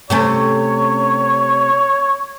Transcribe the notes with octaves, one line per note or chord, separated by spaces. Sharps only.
C3 A3 C#4 C#5